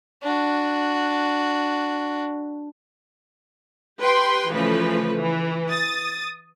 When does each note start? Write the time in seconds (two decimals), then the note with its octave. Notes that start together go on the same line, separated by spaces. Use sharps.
0.22 D4 F#4
4.01 G4 B4 G5 C6
4.51 C#3 E3 F3 A3 B4
5.17 E3
5.69 D#6 A6